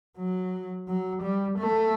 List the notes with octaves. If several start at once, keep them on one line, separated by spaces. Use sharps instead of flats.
F#3
F#3
G3
A3